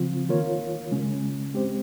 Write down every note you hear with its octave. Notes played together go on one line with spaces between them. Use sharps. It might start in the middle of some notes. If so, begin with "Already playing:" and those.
Already playing: C#3 F3 C4 F4
D#3 A#3 F4 A#4 C#5
C#3 G#3 C#4
G#3 C4 G4 C5